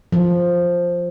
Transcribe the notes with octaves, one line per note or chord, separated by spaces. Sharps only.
F3